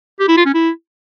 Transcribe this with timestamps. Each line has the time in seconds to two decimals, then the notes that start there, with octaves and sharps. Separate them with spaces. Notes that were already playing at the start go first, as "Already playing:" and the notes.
0.20 G4
0.28 E4
0.37 F4
0.46 C#4
0.54 E4